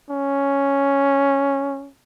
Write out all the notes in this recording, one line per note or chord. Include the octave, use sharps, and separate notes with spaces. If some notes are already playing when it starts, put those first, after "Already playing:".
C#4